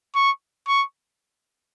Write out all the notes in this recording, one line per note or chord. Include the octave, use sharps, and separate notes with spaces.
C#6
C#6